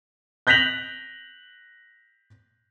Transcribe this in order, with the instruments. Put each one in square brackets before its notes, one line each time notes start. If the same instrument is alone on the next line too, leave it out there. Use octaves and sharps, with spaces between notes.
[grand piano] F#6 G6 A#6 B6 F7 F#7